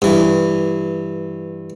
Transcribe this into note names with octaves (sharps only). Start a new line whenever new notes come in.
G2 E3